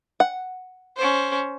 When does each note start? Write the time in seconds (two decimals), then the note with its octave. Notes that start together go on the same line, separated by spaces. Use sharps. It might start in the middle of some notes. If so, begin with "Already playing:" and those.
0.20 F#5
0.97 C#4 C5